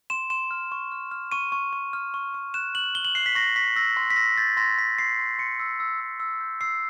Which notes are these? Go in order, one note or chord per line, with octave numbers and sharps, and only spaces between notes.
C6 E7
C6 E7
F6
C#6
F6
F6
C#6 D#7
C#6
C#6
F6
C#6
C#6
F#6 E7
F#6 F#7
F#6 G7
F#7
F#6 C7
B6
C#6 A#6
C#6 B6
E6 A#6
C6
B6
E6 A#6
G6 A6
C6 A#6
C6 B6
C6 C7
C6
C6 C#7
E6
E6
E6
E6
G6
E6 C7